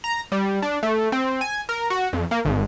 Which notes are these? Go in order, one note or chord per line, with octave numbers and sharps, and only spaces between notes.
A#5
G3
D4
A3
C4
G#5
A#4
F#4
F2
A#3
G#1